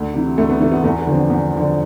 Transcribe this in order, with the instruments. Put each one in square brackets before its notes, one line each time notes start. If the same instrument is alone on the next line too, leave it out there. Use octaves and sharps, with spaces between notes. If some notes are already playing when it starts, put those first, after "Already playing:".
Already playing: [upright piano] D2
C3 E3
D2 A3
B3
C3 E3 A3
B3
E2 A3
B3
D3 F3 C4
D4
E2
D3 F3